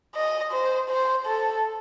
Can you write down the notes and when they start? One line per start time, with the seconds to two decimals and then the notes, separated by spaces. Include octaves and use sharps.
0.15 D#5
0.52 C5
0.90 C5
1.27 A4